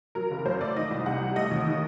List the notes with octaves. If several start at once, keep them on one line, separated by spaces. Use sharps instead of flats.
F#3 A#4
F#1
F#2 C5
A3 D5
D#3 D#5
C2
C3 F#5
G3
A3 D#5
D#2
D#3